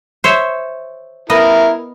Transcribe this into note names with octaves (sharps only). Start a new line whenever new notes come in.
C5 C#5 E5
B3 E4 A#4 D#5